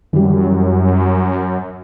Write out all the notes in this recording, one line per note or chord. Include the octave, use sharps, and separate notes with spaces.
F#2 E3 G3